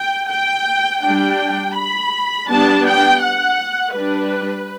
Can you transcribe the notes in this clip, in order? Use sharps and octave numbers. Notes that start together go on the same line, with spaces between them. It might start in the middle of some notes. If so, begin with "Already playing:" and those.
Already playing: G5
G5
G3 D4 G5
B5
G3 B3 D4 A5
G5
F#5
G3 D4 B4